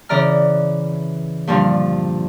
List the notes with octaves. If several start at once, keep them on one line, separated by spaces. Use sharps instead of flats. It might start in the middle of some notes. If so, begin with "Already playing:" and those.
C#3 E3 D5 A#5 F6
G2 A#2 D3 F3 G3